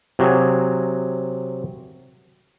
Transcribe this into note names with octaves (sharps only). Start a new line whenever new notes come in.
C3 F#3 G#4